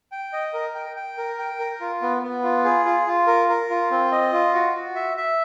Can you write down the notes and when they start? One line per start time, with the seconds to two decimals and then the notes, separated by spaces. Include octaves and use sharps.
0.12 G5
0.33 D#5
0.54 A#4
0.75 G5
0.96 G5
1.17 A#4
1.39 G5
1.59 A#4
1.81 F4
2.02 B3
2.22 B3
2.43 F4
2.64 G#4
2.85 F4
3.07 F4
3.27 A#4
3.49 A#4
3.70 F4
3.91 C4
4.12 D#5
4.33 F4
4.54 F#4
4.74 F#4
4.95 E5
5.17 E5